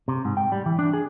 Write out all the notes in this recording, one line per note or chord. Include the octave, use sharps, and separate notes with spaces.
C3
G#2
G5
G3
E3
D4
G#4